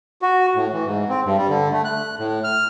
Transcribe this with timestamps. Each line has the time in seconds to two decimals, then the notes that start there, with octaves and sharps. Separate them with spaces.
0.22 F#4
0.56 A2
0.73 E3
0.86 G#2
1.09 C4
1.25 G2
1.38 G3
1.49 D3
1.72 A3
1.85 F#6
2.19 A2
2.44 F6